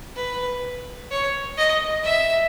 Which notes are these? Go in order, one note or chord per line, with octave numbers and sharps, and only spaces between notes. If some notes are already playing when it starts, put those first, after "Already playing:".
B4
C#5
D#5
E5